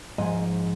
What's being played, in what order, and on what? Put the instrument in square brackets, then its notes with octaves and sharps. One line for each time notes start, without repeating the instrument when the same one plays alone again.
[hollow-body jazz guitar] G#2 F3 G#3 D#5